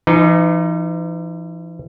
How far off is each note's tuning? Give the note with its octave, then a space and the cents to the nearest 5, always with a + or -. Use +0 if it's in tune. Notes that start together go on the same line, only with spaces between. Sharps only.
E3 +45 D#4 +0